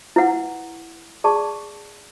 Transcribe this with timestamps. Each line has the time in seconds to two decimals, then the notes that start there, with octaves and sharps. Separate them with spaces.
0.16 E4 B4 F#5
1.24 G#4 D5 A5 C#6